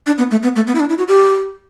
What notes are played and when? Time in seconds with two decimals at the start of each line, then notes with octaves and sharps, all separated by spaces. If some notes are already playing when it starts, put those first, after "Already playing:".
0.07 D4
0.18 B3
0.31 A3
0.43 B3
0.56 A3
0.67 B3
0.75 E4
0.80 D4
0.89 E4
0.98 F#4
1.08 G4